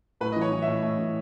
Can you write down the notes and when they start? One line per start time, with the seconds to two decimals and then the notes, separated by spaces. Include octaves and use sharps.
0.21 A2 B4
0.32 E3 D#5
0.41 C#5
0.52 E3
0.62 E5
0.68 A2
0.83 A2
0.98 E3